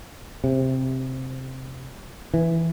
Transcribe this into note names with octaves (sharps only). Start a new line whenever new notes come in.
C3
E3